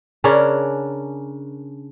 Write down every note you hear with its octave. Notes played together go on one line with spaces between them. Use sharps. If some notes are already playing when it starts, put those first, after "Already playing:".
C#3 C#4 D4 A#4